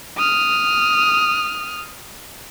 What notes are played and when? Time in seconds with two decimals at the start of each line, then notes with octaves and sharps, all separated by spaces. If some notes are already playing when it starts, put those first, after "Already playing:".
0.17 D#6 F6